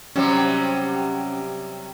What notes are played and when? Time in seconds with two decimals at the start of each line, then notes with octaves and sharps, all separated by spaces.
0.16 C3 F#3 G3 C#4